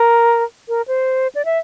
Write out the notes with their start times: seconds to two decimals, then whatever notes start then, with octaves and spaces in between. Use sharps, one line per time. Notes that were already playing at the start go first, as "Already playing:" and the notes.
Already playing: A#4
0.68 A#4
0.88 C5
1.35 D5
1.45 E5